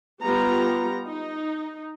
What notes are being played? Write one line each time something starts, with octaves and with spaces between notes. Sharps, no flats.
G3 B3 F4 G4 A#5
D#4